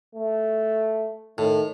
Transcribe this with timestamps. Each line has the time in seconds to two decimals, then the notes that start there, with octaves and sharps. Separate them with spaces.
0.15 A3
1.38 A2 D#3